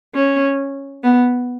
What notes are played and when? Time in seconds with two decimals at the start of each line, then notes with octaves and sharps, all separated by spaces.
0.14 C#4
1.03 B3